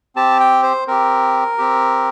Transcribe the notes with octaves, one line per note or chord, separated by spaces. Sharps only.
C4 G4 A5
G5
C5
C4 G4 A#4
C4 G4